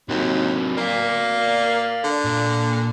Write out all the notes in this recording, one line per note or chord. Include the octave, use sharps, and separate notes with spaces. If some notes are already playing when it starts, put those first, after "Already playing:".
D#2 C3 F#3
A#3 D5 F5
D3
A#2